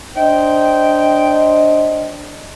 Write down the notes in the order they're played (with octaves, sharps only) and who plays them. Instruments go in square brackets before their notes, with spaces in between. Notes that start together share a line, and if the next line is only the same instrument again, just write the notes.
[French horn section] D4 C5 D#5 [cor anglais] G5